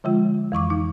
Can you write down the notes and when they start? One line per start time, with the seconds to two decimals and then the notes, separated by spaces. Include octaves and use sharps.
0.04 D3 F3 G#3 F4
0.52 F2 E3 C#6 D6
0.70 D#4